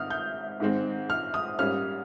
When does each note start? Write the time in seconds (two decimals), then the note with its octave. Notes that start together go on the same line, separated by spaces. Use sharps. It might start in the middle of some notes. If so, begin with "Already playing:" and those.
Already playing: G#2 D#3 C4 D#6 F6
0.10 G6
0.60 G#2 D#3 G#3 C4
1.10 F6
1.34 D#6
1.59 G#2 G3 A#3 C#4 F6